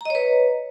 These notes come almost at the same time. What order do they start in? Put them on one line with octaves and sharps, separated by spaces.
A#5 D#5 C#5 B4